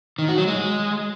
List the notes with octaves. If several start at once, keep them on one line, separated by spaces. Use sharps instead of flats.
D#3
F#4
F#3
G#3